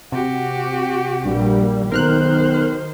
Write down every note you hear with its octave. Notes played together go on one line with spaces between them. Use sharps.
C3 F#4 G4
A#1 G2 G3 A#3
B1 D#3 A#4 C5 F6 F#6